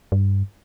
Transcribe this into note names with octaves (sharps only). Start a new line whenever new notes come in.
G2